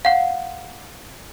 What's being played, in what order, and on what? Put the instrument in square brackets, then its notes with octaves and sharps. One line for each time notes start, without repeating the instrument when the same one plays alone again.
[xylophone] F5 F#5